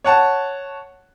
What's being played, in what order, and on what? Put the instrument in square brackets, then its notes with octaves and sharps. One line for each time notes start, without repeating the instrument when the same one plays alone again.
[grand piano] C#5 F#5 A5